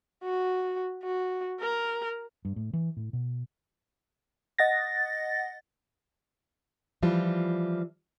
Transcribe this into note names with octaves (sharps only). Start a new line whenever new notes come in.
F#4
F#4
A#4
G2
A2
E3
A2
B2
D#5 F#5 A6 A#6
E3 F3 G3 F4